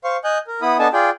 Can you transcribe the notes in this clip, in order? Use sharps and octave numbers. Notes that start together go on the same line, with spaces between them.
C5 F5 C#6
D#5 G#5 F#6 G6
A#4
B3 E4 B5 D#6
B3 D4 A4 D#5 G#5 A5
F4 G#4 D5 G5